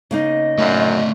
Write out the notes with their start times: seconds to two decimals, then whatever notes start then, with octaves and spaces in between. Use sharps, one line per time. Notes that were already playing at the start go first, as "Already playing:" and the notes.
0.11 C#3 A#3 D#4 D#5
0.58 F#2 A3 D5 F5